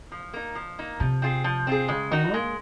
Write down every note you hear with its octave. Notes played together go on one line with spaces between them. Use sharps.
F3
A#3 D#4
F3
A#3 D#4
C3 F3
C4 F4 G#4
F3
C4 F4 G#4
C#3 G#3
D#3 D#4 F#4
G#3 A#3